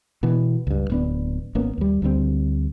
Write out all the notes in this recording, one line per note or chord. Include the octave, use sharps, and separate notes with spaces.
B2 E3 B3
C#2 G2
D1 B3 D4
G#1 A#3 B3 C#4
D#2 G3
D2 D3 G3 C4